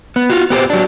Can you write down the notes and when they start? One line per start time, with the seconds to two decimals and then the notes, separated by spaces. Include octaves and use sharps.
0.16 B3
0.30 F4 F#4
0.50 B3 G4 A#4 C5
0.70 F#3 D4